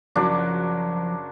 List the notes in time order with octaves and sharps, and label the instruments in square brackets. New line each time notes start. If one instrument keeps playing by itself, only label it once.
[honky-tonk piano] F#1 F#3 D6 [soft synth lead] F3 [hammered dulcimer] D4 D5